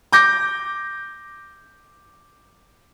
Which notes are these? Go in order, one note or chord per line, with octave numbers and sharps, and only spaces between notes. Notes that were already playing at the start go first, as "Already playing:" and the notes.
D6 G6 A#6